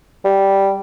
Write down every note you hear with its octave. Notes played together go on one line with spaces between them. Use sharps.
G3